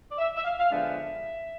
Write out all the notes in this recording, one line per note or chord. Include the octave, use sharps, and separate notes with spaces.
D5
E5
E5
F5
F5
D3 F3 G#3 B3 D4 E5